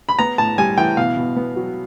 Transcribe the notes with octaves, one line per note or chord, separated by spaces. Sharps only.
B5
B3 A#5
A2 A5
G3 G#5
E3 G5
B2 F5
B2
B3
F#3